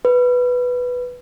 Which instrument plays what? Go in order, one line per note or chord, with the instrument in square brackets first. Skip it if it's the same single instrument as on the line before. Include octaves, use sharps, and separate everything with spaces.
[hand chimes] B4